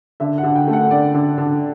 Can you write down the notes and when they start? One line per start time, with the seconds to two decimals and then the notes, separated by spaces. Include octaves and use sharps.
0.20 D3 E5
0.38 F#5
0.43 D3
0.56 G5
0.68 A3
0.73 F#5
0.91 D3 D5
1.14 D3
1.38 D3